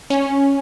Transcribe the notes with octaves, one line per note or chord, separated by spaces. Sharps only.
C#4